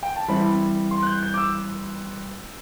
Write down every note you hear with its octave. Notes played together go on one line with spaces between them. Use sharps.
G5
A5
E3 G3 C4 E4 B5
C6
F#6
G6
G6
D6
E6